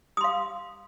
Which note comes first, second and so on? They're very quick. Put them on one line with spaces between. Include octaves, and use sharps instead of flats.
D#6 C6 F5